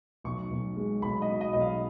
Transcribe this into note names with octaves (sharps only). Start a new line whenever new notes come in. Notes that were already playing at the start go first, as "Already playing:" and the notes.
B1 C#6
B1
G#3
B1 B5
D#5
B2
D#5
B1 D#5
F5